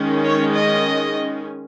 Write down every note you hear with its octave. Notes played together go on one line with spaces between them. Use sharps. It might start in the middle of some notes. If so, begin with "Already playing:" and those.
Already playing: D#3 G#3 C#4
C#5
D#5